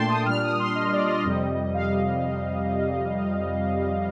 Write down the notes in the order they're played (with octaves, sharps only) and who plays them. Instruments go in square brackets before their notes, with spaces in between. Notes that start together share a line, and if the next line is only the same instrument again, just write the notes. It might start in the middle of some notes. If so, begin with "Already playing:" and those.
Already playing: [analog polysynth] A#2 A3 D4 G5 A5 C6
D#6
A#2 G3 D4 F6
D#6
C6
D#5
D5
D#5
F2 C3 G3
F5